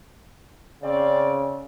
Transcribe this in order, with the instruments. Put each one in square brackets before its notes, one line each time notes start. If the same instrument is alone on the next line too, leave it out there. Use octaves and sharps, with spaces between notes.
[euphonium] C#3 [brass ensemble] C4 C#4 D5